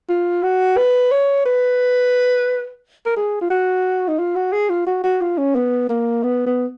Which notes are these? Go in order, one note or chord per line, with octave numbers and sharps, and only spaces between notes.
F4
F#4
B4
C#5
B4
A#4
G#4
F4
F#4
D#4
F4
F#4
G#4
F4
F#4
F#4
F4
C#4
B3
A#3
B3
B3